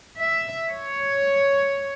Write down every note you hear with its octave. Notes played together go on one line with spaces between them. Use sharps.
E5
C#5